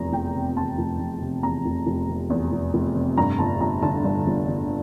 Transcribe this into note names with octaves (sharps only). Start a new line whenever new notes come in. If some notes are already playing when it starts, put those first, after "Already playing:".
Already playing: F1 E2 A#5
F1 G5
C3
E2 A5
F1
F1
C3
E2 A#5
F1
F1
C3
E2
F1
F1
C3
G2 A#5
G1 A5
G1 A#5
D3 A5
G2
G1
G1